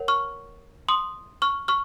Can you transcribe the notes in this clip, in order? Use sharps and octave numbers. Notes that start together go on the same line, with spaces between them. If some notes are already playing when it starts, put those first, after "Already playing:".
Already playing: A#4 C#5 F#5
C#6 F6
C6 D#6
C#6 F6
C#6 F6